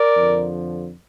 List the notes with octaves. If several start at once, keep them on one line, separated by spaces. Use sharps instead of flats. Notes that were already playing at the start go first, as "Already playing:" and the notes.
Already playing: A#4 D5
F2 D3 F3